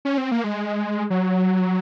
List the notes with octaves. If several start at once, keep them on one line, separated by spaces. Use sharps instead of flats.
C#4
C4
A#3
G#3
F#3